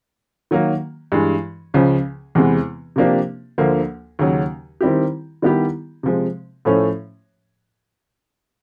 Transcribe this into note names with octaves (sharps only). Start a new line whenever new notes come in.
D#3 F#3 A#3
G2 E3 G#3
C#2 C#3 F3
E2 C3 E3 G#3 B3
C3 F3 A#3 D4 G4
D2 D3 F3 A#3
D#2 C#3 F#3
D#3 G3 C4 E4 G4
D#3 G3 B3 E4 G4
C3 F3 G#3
A2 F3 A3 C#4